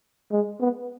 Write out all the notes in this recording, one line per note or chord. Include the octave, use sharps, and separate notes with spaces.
G#3
B3